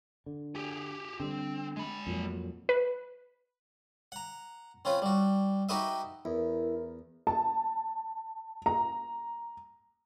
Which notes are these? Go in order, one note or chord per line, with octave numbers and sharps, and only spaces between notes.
D3
G4 G#4
D3 G3 C4
G#3 B5
F2 A#2 F#3
B4
F#5 A#5
C4 C#4 F4 B4
G3 F#4
D#4 F#4 G4 B4 D#5 E5
E2 E4 A#4
A5
A#5